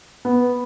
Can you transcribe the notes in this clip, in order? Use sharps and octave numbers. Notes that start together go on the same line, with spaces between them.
B3